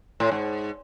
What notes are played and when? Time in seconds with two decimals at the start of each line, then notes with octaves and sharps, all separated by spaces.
0.20 A2
0.31 G#2